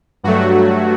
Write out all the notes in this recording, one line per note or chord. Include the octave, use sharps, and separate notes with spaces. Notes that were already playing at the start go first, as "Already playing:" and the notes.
G2 F#3 A3 F#4